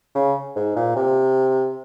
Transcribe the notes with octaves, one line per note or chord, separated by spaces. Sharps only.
C#3
G#2
A#2
C3